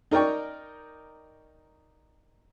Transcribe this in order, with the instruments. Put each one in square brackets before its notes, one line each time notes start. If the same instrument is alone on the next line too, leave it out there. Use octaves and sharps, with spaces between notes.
[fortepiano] D#4 A#4 D5 G5 C#6